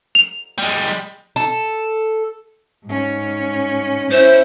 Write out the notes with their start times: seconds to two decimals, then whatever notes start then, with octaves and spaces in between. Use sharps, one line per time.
0.15 F7
0.58 G3 G#3
1.36 A4
2.86 G#2 C#4
4.11 C#4 E4 C5